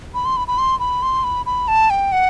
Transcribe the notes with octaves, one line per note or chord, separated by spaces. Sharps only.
B5
C6
B5
B5
C6
B5
C6
B5
B5
A5
G5
F#5